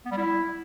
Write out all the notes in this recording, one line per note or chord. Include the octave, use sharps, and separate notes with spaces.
B3
G3
E4